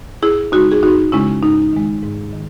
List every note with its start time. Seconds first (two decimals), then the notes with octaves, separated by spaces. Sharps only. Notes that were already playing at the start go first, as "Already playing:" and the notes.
0.23 F#2 E4 G#4
0.52 C#3 G#3 D#4 F#4
0.72 G#4
0.83 F#2 D#4 F#4
1.12 C#3 G#3 C#4 E4
1.42 G#2 D#4
1.73 D#3 G#3
2.03 G#2
2.33 D#3